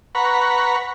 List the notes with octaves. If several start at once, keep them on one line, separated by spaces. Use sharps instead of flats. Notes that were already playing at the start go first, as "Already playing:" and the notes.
B4 F#5 A#5 B5 C#6